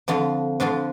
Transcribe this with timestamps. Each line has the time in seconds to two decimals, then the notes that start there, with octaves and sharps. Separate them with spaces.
0.08 F2 D3 F3 D4 F4
0.60 F2 D3 F3 D4 F4